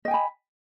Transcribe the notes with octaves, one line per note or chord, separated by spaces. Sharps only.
D#5 G5 G#5 B5